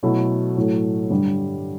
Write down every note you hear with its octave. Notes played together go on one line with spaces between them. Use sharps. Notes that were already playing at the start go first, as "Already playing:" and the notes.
B2 F#3 A3 E4 A4
A2 F#3 A3
G2 D3 G3